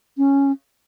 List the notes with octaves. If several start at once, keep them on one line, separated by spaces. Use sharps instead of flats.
C#4